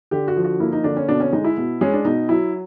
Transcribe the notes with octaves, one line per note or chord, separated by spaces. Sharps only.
D3 G4
F#4
F3
F#4
A#3 E4
D#4
D3 D4
C#4
B2 D4
C#4
G#3 D#4
E4
B2
G#3 C#4
D4
B2 D#4
F#3 E4